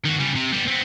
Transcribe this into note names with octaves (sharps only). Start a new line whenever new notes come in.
D#3 F#4
C#3 G3
C3
G3 B3
B3 C4